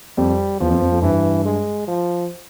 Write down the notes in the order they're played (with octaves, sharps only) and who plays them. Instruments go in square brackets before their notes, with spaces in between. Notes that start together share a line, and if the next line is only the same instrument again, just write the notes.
[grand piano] F2 [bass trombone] G3
[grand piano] E2 [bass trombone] F3
[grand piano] F2
F2
F2
[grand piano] G2 [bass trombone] E3
[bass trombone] G#3
F3